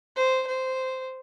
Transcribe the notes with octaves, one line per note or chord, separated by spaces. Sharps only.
C5
C5